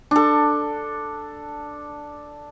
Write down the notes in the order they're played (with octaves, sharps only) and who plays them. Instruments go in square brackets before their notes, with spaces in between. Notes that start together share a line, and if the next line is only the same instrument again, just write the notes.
[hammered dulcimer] D4 A4